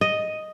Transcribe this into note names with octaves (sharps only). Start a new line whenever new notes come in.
D#5